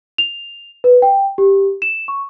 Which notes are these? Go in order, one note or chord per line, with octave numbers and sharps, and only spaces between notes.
F7
B4
G5
G4
E7
C#6